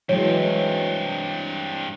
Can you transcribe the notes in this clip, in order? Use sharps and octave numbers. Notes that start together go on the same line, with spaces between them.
G2 E3 F#3 G#3 C4 C#5